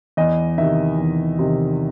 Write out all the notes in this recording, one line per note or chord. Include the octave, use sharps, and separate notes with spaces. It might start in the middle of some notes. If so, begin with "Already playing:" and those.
E2 D#5
C3 D#3 E5
E2
C3 D#3